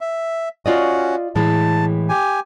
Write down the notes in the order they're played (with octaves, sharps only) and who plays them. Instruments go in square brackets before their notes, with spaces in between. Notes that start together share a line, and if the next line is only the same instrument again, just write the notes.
[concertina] E5
[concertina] C#4 F#4 [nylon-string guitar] F4 D5 D#5
[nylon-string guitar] A2 E3 G#3 [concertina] A5
[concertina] G4 G#5